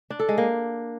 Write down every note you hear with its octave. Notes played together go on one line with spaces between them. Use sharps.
D4
A4
G#3
A#3